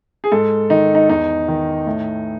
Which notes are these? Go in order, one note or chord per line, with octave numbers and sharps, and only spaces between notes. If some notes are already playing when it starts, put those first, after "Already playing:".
G#4
G#2 A4
D#3 D#4
D#4
E2 D#4
D#3
A2